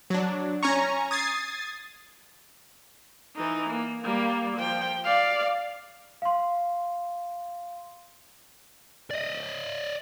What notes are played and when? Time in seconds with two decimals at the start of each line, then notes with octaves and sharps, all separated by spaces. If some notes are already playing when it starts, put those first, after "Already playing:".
0.10 F#3 D4
0.63 C#4 G#5 A#5 C#6
1.11 D#6 G#6 A6 C7
3.36 E3 D#4
3.71 A#3
4.04 G3 A#3
4.57 F3 G5
5.04 D5 F5
6.22 F5 C6
9.10 D5 D#5